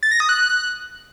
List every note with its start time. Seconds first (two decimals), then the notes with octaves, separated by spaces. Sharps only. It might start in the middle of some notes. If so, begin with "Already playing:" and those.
0.03 A6
0.11 A#6
0.20 D#6
0.29 F#6